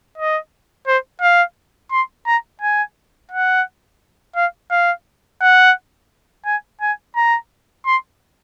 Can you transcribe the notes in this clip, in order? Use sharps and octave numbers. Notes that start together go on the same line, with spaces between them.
D#5
C5
F5
C6
A#5
G#5
F#5
F5
F5
F#5
G#5
G#5
A#5
C6